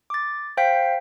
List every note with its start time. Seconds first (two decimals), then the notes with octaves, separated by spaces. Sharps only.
0.10 D6 A6
0.57 C5 F5 G5 G6 B6